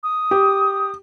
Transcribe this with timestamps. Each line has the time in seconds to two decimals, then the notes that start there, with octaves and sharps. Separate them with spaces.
0.03 D#6
0.31 G4